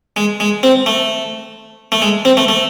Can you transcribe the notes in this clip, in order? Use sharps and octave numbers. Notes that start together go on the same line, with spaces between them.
G#3
G#3
C4
A3
A3
G#3
C4
A3
A3